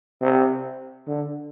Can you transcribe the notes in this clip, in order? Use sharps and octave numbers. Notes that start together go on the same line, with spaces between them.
C3
D3